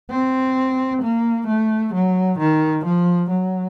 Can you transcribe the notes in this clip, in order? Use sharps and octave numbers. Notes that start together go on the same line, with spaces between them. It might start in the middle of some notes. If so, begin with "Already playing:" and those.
C4
A#3
A3
F#3
D#3
F3
F#3